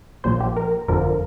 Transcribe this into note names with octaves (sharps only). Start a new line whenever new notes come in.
A#1 A#2 F3 C5
G4
A#4
G1 F2 D3 F3 A#4